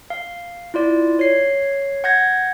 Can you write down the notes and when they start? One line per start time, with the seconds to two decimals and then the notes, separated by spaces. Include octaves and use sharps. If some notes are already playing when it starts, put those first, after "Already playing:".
0.10 F5
0.74 E4 F4 D5
1.19 C#5 C7
2.04 F#5 G6 G#6 A#6